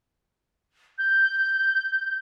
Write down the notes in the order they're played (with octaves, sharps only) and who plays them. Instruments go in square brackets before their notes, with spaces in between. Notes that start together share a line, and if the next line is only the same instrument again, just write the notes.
[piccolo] G6